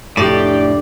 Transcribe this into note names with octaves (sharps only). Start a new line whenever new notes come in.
F1 A2 D4 G4 D5